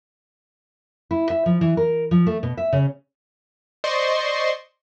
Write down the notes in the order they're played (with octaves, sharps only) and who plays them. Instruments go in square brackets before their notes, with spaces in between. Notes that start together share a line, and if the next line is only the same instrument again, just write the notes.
[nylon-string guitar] E4
E5
F3
E3
A#4
F3
A3
B2
E5
C#3
[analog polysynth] C5 D5 D#5 C6 C#6